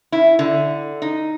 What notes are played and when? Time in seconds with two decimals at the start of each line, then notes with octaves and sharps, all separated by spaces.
0.12 E4
0.39 D3
1.02 D#4